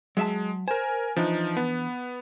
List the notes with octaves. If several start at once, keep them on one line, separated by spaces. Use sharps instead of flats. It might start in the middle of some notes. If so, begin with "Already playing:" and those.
F#3 G#3 E5 A5
A#4 C5 G#5
E3 F3 D4 D#4
B3